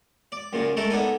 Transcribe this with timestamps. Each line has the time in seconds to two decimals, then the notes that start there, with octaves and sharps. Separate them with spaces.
0.32 D5
0.53 F#2 A#2 C#3
0.77 G#3 A3 A4 A#4
0.90 B3 D4 D#4 A4 G#5